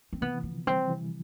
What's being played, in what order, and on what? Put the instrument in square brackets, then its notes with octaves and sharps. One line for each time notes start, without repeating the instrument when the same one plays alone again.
[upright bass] C4
[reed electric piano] C3 E3 [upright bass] B3
[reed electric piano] E3
[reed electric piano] D3 F3 [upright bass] B3
[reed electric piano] E3 G3 [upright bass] C4
[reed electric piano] C3 E3